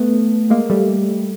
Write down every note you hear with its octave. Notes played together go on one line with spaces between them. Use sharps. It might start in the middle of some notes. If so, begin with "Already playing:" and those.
Already playing: A3 B3
G#3 A#3
G3 A3